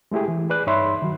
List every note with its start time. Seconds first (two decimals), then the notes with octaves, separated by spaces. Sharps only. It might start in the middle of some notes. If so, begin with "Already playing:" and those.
0.12 G#3 A3 E4 G4 G#4
0.28 E3
0.50 G#4 B4 D5 F#6
0.67 G2 D#4 C#5 E5 B5 C6
1.02 D#3 F#3